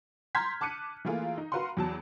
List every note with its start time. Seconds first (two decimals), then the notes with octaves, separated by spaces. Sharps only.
0.35 A#5 C6 F6 G6 G#6 B6
0.61 A5 D6 F#6 C#7 D#7
1.05 E3 A3 A#3 F4 G#4
1.38 D#4
1.52 F#4 A#4 B4 F5 F#5 C6
1.77 E2 F#3 A5